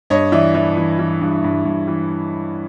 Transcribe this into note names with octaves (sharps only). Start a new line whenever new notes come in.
G2 C#5 D#5
E3 D5 E5
E3 D5 E5
E3
E3
G2
G2
G2
E3